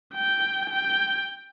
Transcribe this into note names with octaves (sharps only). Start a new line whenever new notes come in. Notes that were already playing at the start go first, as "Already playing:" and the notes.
G5
G5